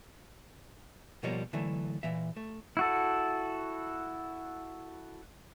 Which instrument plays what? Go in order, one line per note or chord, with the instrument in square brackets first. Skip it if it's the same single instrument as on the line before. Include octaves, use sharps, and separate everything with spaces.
[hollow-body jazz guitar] B2 F3 G3 A#3 C#5
D3 E3 F#3 A3
A#2 E3 E5
A3
[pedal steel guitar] E4 F#4 A4